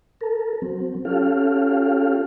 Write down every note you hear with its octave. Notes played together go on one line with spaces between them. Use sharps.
A4 A#4
F#3 C4
C#4 F4 G4 A4 F5